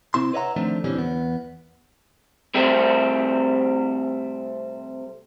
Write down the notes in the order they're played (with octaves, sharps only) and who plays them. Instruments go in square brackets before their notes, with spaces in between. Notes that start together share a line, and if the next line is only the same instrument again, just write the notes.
[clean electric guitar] C3 C4 E4 C6
B4 C#5 D#5 E5 F#5 A#5
D3 D#3 F3 A3 C4 D4
A#2 D3 E3 G3 C4 C#4
E2 B3
C3 G3 A3 C4